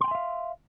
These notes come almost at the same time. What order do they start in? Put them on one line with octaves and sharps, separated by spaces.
C6 G5 G#5 E5 F5